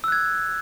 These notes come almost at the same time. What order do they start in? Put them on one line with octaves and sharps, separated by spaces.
E6 F#6 G#6